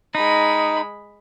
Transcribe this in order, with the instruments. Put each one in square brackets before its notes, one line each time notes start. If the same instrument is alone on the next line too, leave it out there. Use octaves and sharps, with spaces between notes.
[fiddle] G#3 B5 [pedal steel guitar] D#4